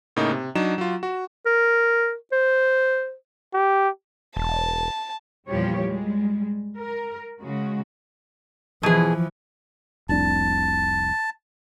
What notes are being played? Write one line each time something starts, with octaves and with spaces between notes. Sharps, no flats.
A2 C#3 A#3 D#4
C3
F#3 D4 D#4 E7
F#3 F4
F#4
A#4
C5
G4
E1 A5
E2 A#2 F3 G3 G4 C#5
G3 G#3
A#4
C#3 G#3 F#4
B2 E3 F3 G#4
F1 C2 D4 A5